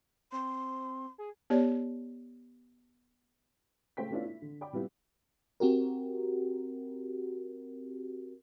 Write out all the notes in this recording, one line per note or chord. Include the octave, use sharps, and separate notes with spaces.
C4 C6
G#4
B3 G4 C#5 D5
C#3 A3 C5 G5 B6
A3 B3 C#4 D4 E4 F4
E4
D3
D5 G5 B5 D6
C3 G3 B3 E4 F4 G4
C4 F#4 G4 A#4